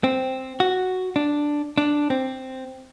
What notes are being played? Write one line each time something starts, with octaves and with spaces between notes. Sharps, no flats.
C4
F#4
D4
D4
C4